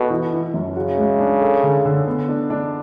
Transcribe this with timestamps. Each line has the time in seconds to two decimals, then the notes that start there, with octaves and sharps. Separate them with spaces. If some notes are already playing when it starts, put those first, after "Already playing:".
Already playing: B2 A4
0.10 E3
0.33 E3
0.54 F#2
0.76 C#3 F#4
0.98 G#3
1.19 D4
1.41 A4
1.63 D3
1.85 D3
2.07 B3
2.28 D4
2.50 D4